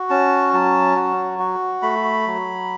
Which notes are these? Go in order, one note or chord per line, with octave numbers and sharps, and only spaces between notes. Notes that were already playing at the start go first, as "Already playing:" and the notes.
Already playing: F#4
C#4 A5
F#3 A5
F#4
F#4
A3 B5
F#3